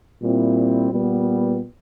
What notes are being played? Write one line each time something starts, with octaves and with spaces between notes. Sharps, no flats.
A#2 G3 C4 E4
A#2 G3 B3